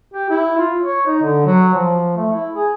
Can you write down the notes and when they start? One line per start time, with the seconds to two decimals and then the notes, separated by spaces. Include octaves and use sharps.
0.14 G4
0.30 E4
0.58 F4
0.82 C#5
1.06 D#4
1.22 D3
1.46 F#3
1.73 F3
2.17 A3
2.32 E4
2.55 G#4